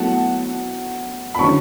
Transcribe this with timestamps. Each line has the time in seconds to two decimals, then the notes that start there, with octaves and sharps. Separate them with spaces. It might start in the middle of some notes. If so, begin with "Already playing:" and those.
Already playing: B2 F#3 A3 E4 F#5 A5
1.35 B5
1.39 D3 F#3 C#4 E4 A5 C#6